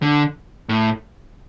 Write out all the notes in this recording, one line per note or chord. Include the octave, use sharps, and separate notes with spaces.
D3
A2